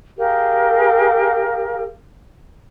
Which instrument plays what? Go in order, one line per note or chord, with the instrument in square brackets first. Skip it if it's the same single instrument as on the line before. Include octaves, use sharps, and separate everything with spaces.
[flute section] G4 G#4 A#4 F5